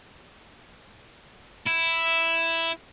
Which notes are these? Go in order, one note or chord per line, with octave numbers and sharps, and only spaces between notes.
E4